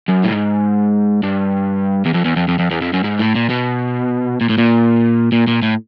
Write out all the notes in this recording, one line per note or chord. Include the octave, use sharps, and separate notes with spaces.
F#2
A2
G#2
G2
E2
F2
E2
F2
F2
F2
E2
F2
F#2
G#2
A2
A#2
B2
A#2
A2
A#2
A#2
A#2
A2